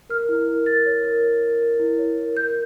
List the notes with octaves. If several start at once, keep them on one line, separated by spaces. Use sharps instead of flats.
A#4 F6
E4
A#4
A#4 A6
C#5
A#4
C#5
A#4
A#4
E4
C#5
A#4
A#4 G6